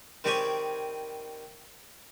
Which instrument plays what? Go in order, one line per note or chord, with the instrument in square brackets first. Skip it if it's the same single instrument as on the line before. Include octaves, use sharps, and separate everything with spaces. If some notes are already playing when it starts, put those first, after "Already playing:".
[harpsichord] D#3 G3 C4 G4 G#4 C#5